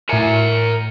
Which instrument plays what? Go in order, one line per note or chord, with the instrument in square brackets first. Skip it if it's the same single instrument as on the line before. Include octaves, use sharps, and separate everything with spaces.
[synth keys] A2 E5 C#7 [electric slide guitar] A#4 G#5 A#5